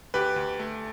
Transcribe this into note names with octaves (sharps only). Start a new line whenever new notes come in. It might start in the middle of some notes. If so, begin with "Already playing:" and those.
D2 G4 B4
D2
A3